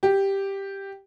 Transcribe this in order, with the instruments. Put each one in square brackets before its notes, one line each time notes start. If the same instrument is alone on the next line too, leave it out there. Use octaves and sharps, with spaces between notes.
[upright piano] G4